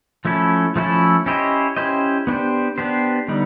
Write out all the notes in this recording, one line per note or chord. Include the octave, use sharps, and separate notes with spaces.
F3 A3 C#4 E4 A4
F3 A3 C#4 E4 A4
C#4 E4 G4 C5 D#5
C#4 E4 G4 C5 D#5
B3 D4 G4 C5
B3 D4 G4 C5
D3 G3 B3 D#4